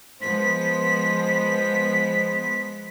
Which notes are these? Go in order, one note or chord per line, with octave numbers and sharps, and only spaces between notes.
F3 G#3 B3 C5 B6